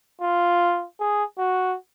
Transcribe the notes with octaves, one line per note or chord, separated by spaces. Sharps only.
F4
G#4
F#4